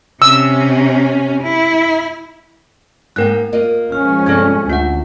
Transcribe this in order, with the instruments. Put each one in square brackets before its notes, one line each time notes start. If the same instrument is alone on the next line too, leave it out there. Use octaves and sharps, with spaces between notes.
[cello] C3 C#4 [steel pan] E6
[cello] E4
[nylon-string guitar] G#2 A#3 G5 [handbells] A#4 F#6
[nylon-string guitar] A#3 F4 D#5
[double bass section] F3 G#3 C#4 [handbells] F6
[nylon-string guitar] G2 C3 G3 [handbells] A4 F6 G#6
[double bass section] D2 [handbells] F4 F#5 [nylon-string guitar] E5